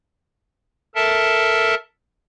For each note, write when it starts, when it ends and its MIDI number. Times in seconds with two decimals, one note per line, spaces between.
0.95 1.75 69
0.95 1.75 70
0.95 1.75 76
0.95 1.75 81